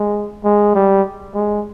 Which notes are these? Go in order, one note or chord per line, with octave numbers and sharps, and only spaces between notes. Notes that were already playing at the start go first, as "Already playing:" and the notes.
Already playing: G#3
G#3
G3
G#3